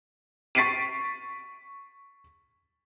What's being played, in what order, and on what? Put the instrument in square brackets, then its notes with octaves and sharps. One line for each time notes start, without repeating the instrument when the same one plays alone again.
[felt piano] C#6 A6 B6 C7 D7 D#7